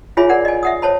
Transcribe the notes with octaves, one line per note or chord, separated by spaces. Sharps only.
F4 G#4 C#5 E5 G#5 B5
A#4 D5 F#5
D#5 G#5
E5 F#5 D#6
C5 C#5 A5 B5